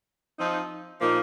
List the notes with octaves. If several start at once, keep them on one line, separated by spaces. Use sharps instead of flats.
F3 C4 D#4
A#2 F3 A#3 D#4